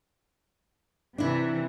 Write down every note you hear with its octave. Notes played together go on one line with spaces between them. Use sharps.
C3 E3 D4 E4